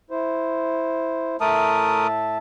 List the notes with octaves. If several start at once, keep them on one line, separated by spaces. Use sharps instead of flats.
E4 C5
A2 A3 A#4 E5 A5 D#6